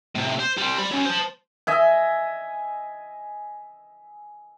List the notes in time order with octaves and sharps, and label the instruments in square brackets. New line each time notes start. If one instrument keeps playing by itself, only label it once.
[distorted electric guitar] A2 C3
C5
G3 C4
D5 B5
F#3 C#4
C5 A5
[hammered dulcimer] D#5 E5 G#5